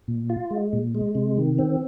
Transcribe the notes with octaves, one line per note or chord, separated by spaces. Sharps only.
A#2
F4
G#3
A#2
G#3
C3
D#3
C4